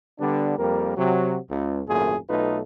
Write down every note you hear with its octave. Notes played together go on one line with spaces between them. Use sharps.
D3 G3 B3 D4
F2 G3 A#3 A#4
C3 F#3
C#2
G#1 F#2 A#2 A3 G#4
B1 A3 D#4 F4 B4